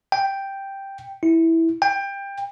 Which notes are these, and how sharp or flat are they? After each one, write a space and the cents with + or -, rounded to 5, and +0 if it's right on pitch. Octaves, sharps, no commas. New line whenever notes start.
G5 +0
E4 -10
G5 +20